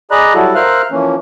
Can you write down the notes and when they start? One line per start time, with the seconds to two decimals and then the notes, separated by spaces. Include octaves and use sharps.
0.11 G#4 D5 D#5 A#5 B5 F#6
0.35 F#3 G3 E4 F#4 A4
0.55 A#4 C5 E5 F5 F6 F#6
0.92 E3 F3 A#3 C#4